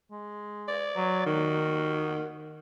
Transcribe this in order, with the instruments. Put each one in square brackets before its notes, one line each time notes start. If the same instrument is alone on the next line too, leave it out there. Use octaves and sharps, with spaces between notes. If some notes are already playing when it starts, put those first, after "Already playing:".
[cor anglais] G#3
[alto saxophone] D5
[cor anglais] F#3
[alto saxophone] D#3 [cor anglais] F#4